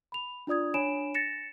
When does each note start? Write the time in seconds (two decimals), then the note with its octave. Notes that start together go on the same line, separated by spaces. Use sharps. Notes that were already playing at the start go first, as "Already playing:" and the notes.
0.12 B5 F7
0.47 D4 F4 D5 D#6 G#6
0.74 D4 C#5 G#5 B5 D7 E7
1.14 A6 A#6 C#7 E7